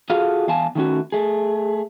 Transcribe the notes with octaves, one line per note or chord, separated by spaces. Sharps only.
F4 F#4 G#4 A4 F5
E2 F5 G#5 A5
D#3 A3 C#4 F#4
A3 G#4